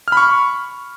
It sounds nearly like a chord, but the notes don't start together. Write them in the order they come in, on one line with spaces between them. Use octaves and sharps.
F6 B5 C#6